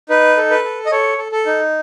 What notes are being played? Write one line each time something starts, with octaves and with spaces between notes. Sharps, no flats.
D#4 B4
A4
B4
A4
D#5
A4 C#5
A4
A4
D#4